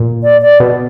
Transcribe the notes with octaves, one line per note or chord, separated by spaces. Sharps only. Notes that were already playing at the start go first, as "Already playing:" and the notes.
Already playing: A#2
D5
D5
B2